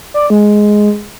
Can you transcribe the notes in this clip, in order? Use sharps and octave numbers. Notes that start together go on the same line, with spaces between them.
D5
G#3